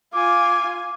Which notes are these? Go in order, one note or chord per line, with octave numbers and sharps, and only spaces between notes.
F4 G#5 D6